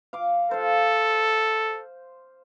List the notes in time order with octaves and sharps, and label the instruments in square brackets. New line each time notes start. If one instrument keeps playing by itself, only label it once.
[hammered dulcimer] F5 D6
[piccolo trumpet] A4 [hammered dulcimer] C5 F5